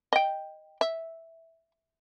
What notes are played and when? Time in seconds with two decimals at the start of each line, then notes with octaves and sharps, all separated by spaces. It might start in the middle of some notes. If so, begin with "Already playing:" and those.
0.13 D#5 G5
0.81 E5